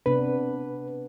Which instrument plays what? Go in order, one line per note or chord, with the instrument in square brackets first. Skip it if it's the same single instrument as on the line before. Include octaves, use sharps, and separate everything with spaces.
[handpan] C3 B3 D4 [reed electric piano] B4